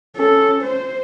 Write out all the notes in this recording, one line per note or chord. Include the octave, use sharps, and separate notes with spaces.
C#4 A4
C5